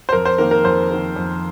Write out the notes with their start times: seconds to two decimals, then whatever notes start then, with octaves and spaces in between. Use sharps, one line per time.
0.09 C5
0.13 F2 A#4
0.25 C5
0.38 D#3 A#3 A#4
0.51 A#4
0.64 F2 C5
0.90 D#3 A#3
1.16 F2